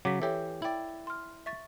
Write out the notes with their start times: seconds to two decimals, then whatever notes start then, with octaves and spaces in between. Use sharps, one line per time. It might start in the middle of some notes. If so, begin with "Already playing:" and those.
0.05 C#3 F#3 D6 B6
0.22 E3 G4 A4 C#5 E5
0.62 E4 D5 G5 F#7
1.07 C6 F6
1.46 E5 C#6 A6